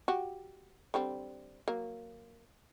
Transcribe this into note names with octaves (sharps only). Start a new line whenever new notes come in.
F#4 G4
D3 G3 C4
F#3 A#3